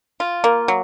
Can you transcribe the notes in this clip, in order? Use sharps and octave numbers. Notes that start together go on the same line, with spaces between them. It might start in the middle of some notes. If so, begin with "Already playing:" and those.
F4
A#3
F#3